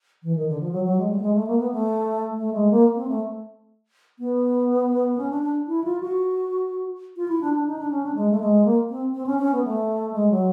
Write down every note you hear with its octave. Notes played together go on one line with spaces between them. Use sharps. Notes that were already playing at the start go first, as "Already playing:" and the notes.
E3
D#3
D3
F3
F#3
F#3
G#3
G3
A3
G#3
A3
A#3
B3
A3
A3
G#3
A#3
C4
A3
B3
C#4
D4
D4
E4
F4
F#4
F4
E4
D4
D4
D#4
D4
C#4
D4
G#3
A3
G#3
A#3
C4
C4
C#4
C#4
B3
A3
G#3
F#3